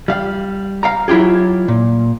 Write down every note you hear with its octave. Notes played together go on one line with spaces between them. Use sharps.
G3 F5
F5 G5 A#5
F#3 E4 F4 G4 G#4
A#2